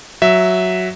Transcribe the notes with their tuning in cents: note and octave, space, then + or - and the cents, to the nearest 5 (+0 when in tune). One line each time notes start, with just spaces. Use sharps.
F#3 +0 E5 +0